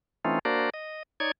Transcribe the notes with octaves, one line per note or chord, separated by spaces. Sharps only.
E3 A3 C4 C#4 D#4 F4
A#3 D4 F#4 A#4 C5 D5
D#5
D#4 C#5 D5 G#6